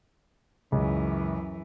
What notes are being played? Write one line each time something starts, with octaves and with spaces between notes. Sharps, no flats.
C#2 F#2 E3